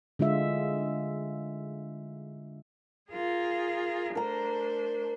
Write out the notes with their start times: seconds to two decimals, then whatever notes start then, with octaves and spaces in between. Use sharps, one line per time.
0.19 D3 G#3 F4 E5
3.11 F4 G#4 A#4
4.15 A3 D4 A#4 C5 A#5